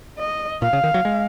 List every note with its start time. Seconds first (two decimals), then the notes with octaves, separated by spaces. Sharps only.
0.19 D#5
0.62 A#2 F5
0.73 C#3
0.84 D#3
0.94 F#3
1.05 G#3